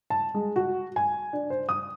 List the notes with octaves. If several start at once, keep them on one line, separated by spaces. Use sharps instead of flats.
A5
G#3
F#4
G#5
D4
C5
D#6